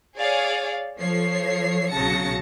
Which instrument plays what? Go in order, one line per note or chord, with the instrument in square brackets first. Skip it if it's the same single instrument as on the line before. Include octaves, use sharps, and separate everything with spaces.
[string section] G#4 C#5 D5 F5
F3 A4 C#5 C7
B1 C#3 F#3 A5 A#6 C#7